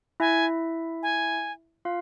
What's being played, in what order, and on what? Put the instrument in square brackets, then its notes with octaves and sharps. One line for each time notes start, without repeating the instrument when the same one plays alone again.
[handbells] E4 E5 [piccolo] G#5
[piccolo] G#5
[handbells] F4 F5